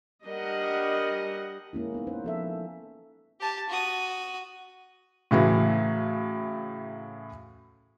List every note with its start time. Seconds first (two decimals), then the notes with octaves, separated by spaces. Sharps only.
0.25 G3 D4 A#4 D#5 F#5
1.73 G#3 A#3 C#4 E4
1.94 B3 D#4
2.07 C#4 B4 C5
2.24 F3 A4 E5
3.40 G4 A5
3.69 F#4 D#6
5.31 A2 C#3 E3 F#3